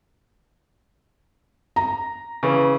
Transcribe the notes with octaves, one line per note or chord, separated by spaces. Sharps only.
A#5
C#3 E3